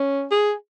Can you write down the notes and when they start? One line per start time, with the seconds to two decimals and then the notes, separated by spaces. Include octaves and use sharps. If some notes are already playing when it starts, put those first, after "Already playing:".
Already playing: C#4
0.31 G#4